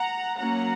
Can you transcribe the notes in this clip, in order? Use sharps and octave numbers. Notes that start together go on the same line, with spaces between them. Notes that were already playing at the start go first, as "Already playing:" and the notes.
Already playing: F#5 A#5
F#3 A#3 C#4 F#5 A#5